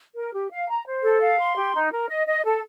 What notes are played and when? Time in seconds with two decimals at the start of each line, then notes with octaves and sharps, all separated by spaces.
0.15 A#4
0.32 G4
0.50 F5
0.68 A#5
0.85 C5
1.02 A4
1.21 F5
1.38 C6
1.56 G4
1.74 D#4
1.91 A#4
2.08 D#5
2.26 D#5
2.44 A4